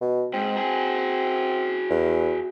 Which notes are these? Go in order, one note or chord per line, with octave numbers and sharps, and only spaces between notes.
B2
G#2 C4
F#4 G#4
E2